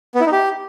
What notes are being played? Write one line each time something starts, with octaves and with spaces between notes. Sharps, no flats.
B3
E4
D#4
G4